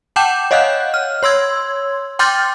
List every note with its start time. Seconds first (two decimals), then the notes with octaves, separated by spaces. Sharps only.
0.16 F#5 G5 A5 D6 G6 E7
0.51 C#5 D#5 F5 F#5 F#6 G6
0.94 F6
1.23 C#5 C6 E6 G#6
2.19 G5 C6 D6 F6 G6 A6